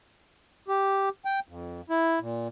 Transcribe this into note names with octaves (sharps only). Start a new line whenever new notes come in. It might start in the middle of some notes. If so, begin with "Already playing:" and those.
G4
G5
F2
E4
A#2